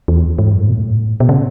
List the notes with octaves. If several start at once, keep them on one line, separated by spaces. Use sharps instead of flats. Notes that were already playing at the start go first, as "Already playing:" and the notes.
E2
G#2
F#2
G#2
B2
A2
B2
C#3